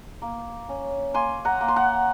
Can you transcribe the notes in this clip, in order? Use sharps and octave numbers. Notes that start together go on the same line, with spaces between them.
A#3
C#4
A#3 G#5 C6
F#5 A#5
A#3
C6
F#5 A#5